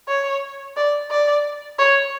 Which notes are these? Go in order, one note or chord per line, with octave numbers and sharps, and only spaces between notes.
C#5
D5
D5
C#5